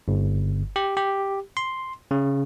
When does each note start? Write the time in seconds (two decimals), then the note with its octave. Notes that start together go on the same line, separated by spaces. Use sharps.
0.08 G1
0.76 G4
0.97 G4
1.57 C6
2.11 C#3